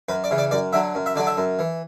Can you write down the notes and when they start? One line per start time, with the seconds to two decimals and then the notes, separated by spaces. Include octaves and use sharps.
0.09 F#2 B4
0.24 D5
0.31 C#3 E3
0.38 D5
0.51 F#2 D5
0.73 D3 F#3 E5
0.95 F#2
1.06 E5
1.16 D3 F#3 D5
1.27 E5
1.37 F#2
1.59 E3